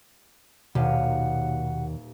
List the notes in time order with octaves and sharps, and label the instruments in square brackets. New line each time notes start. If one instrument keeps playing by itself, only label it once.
[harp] D#1 F5 D#7 [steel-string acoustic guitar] D#2 [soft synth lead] B2 [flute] F#5